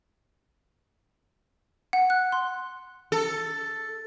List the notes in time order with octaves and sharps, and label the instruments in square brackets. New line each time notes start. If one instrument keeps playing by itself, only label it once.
[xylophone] F#5
F#6
C6
[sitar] A4